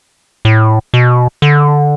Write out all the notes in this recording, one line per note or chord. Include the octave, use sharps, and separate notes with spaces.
A2
B2
D3